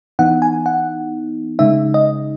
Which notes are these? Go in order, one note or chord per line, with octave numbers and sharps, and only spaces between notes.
E3 B3 D#4 F#5
G#5
F#5
C#3 G#3 D#4 E5
D#5